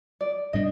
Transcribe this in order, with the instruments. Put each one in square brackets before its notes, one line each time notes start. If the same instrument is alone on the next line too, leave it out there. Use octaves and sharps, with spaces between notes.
[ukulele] D5
[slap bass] A2 G3 D4 [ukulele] D#5